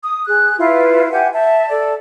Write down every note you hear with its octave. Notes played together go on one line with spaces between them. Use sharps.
D#6
G#4 F#6
E4 F4 B4 F5
G4 E5 F#5 G#5
E5 A5
A4 D5